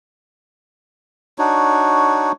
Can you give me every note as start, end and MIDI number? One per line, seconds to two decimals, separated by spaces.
1.38 2.32 62
1.38 2.32 63
1.38 2.32 66
1.38 2.32 73